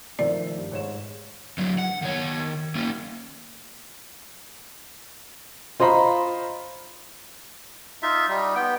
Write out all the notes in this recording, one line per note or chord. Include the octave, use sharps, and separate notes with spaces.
D#3 F3 A3 D5
G2
G#2 C#5 E7
D3 F#3
F#5
D#3 C#5
A#3 C#4
F4 C5 D#5 A#5 B5
D#4 F4 E5
G3 D#4
B3 G5